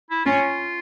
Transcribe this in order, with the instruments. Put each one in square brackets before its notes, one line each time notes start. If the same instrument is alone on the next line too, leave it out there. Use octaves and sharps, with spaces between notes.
[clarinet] E4
[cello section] C#4 [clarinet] F4